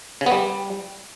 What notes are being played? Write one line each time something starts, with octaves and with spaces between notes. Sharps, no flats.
C#3
B3
G3